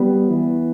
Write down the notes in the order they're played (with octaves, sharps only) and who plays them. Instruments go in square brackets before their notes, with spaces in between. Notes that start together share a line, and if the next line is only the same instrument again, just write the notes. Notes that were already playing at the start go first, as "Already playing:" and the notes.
Already playing: [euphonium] G3 [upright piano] B3
[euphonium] E3